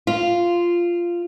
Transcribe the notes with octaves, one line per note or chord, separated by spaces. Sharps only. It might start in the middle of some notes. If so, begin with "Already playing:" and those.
F4